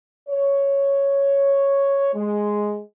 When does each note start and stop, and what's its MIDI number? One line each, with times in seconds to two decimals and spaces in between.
0.29 2.12 73
2.15 2.79 56